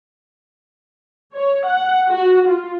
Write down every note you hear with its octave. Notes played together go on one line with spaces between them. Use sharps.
C#5
F#5
F#4
F4